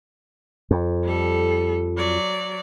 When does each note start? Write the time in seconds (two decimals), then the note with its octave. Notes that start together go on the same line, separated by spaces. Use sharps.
0.71 F2
1.04 G3 A4
1.97 F#3 D5